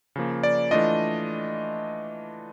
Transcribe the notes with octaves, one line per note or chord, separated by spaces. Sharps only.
C#3 F3 A#3
D5
E3 A3 D4 F4 D#5